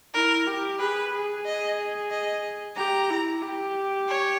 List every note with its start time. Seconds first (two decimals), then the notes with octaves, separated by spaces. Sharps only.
0.14 E4 A#4
0.47 G4
0.79 G#4 B4
1.13 G#4
1.46 D#5
2.11 D#5
2.76 G4 A#5
3.10 E4
3.42 G4
4.08 C#5